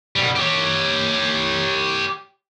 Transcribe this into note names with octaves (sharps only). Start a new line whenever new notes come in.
B2 G3
G4 C#5